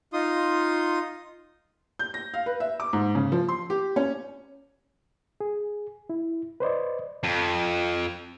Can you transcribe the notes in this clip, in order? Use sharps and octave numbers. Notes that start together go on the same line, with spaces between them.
D#4 F4 C6 D#6
G6
A#6
F5
B4
E5
D6
G#2
C#3
F3
C6
G4
C#4
G#4
E4
B4 C5 D5 D#5
F2